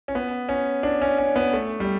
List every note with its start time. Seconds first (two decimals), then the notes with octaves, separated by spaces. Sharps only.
0.08 C#4
0.15 B3
0.49 C#4
0.83 D4
1.02 C#4
1.18 C#4
1.36 B3
1.53 A3
1.80 G3